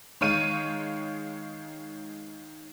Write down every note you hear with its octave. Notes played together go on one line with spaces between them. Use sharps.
D#3 G#3 C#5 F5 D#7